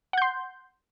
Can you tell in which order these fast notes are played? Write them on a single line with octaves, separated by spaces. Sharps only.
F#5 G6 C6